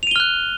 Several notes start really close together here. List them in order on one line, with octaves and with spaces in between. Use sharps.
F7 D#7 G7 F6 F#6